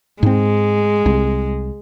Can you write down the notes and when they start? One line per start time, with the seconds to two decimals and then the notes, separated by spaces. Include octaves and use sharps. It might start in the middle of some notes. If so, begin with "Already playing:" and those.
0.23 G#2 G#3 C4
1.06 C2